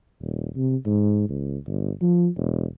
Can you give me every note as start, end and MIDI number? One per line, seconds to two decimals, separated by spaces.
0.21 0.49 27
0.56 0.76 48
0.86 1.26 44
1.30 1.57 37
1.67 1.91 31
2.02 2.28 53
2.37 2.65 28